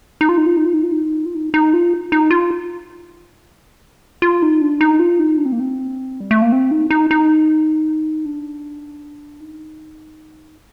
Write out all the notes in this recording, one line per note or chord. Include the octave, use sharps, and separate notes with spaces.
D#4
F4
D#4
F4
D#4
F4
D#4
F4
D#4
F4
D#4
D#4
F4
D#4
F4
F4
D#4
D4
D#4
F4
D#4
D4
C4
A#3
C4
G3
A3
A#3
C4
D#4
D#4
D#4
D4
D#4